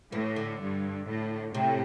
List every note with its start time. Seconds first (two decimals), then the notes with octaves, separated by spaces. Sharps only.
0.12 A2 E3
0.36 D3
0.60 G2
1.07 A2
1.54 A2 C3